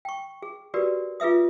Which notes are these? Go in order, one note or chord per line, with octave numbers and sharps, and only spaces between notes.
G5 C#6
G#4
F#4 G4 A#4 B4 D5
F4 G#4 B4 E5 D#6